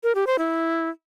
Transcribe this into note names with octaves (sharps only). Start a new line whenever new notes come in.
A#4
G4
C5
E4